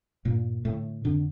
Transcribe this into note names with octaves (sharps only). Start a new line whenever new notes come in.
G2 A#2 A#3
A2 D3 A3
F2 D3 D4